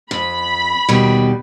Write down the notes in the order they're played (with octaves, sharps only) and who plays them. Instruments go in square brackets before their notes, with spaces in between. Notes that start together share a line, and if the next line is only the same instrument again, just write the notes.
[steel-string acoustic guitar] F2 [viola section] B5
[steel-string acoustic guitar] D#2 B2 G3